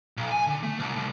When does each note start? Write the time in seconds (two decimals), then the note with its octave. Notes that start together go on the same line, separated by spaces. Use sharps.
0.17 B1
0.31 G#5
0.47 D3
0.63 A3
0.80 C2
0.96 C2